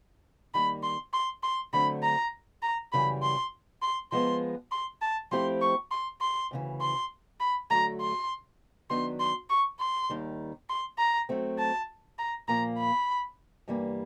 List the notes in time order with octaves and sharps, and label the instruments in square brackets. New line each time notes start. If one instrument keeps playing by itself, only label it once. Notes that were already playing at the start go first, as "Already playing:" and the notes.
[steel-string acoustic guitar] D#3 G3 A#3 [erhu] B5
[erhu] C6
C6
C6
[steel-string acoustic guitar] D3 F#3 A3 C4 [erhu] B5
[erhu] A#5
A#5
[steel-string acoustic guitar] F#2 C#3 E3 G3 [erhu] B5
[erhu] C6
C6
[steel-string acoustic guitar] F3 G#3 B3 [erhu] C6
[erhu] C6
A5
[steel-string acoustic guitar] F3 A3 C4 E4 G4 [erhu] C6
[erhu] C#6
C6
C6
[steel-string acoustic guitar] D2 C#3 E3
[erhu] C6
B5
[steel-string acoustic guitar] D3 F#3 A3 [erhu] A#5
[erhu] C6
[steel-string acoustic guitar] D#3 F#3 B3 D4 [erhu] C6
[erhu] C6
C#6
C6
[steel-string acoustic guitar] D#2 D#3 G3
[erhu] C6
A#5
[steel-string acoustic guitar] F#3 A3 C4
[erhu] A5
A#5
[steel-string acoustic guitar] A#2 F3 A#3 [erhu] A#5
[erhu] B5
[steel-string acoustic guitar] G2 E3 G3 A#3